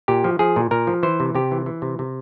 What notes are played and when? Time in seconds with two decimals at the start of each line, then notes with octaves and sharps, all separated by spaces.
0.08 A#2 G4
0.24 F3
0.39 F3 G#4
0.56 A#2
0.71 A#2 A#4
0.87 F3
1.03 E3 C5
1.20 C3
1.35 C3 G4
1.51 E3
1.66 E3
1.82 C3
1.99 C3